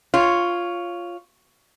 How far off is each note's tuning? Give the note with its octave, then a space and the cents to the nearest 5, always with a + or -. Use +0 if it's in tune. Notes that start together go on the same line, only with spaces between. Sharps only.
F4 +0 C#5 +0